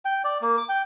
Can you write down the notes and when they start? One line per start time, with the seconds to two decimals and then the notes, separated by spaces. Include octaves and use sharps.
0.05 G5
0.24 D5
0.42 A#3
0.58 D6
0.69 G5